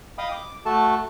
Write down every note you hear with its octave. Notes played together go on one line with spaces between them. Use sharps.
D#5 F5 G5 B5 D#6
D6
A3 F#4 A4 A5